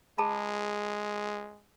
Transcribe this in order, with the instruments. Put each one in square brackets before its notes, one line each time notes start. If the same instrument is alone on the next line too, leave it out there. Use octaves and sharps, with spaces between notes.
[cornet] G#3 [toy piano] G#4 A5 B5